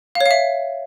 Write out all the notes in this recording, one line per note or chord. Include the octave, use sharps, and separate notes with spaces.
F5
C#5
F5
E5